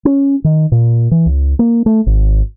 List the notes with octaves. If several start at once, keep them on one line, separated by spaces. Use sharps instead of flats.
C#4
D#3
A#2
E3
C#2
A#3
A3
G#1